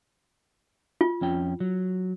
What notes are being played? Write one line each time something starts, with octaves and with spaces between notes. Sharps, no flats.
F4
F2 C#4 G5
F#3